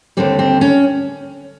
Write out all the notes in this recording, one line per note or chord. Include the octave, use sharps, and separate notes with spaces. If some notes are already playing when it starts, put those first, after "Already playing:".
D#2 D3 G3 C4
C4
C#4